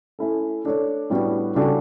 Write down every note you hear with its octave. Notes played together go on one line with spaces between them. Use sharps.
A3 C#4 E4 A4
A3 D4 A4 C#5
A2 G3 B3 D4 F#4
C#3 G3 D4 F#4 A4